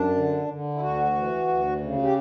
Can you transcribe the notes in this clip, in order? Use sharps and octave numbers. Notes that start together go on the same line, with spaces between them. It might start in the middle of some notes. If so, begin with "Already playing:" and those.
Already playing: F#2 D4
D3
D3
E4
D2 F#4
E3
D2
C#3
G4